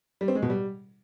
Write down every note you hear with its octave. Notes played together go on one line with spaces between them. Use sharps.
G3
C4
G#3
B2
G3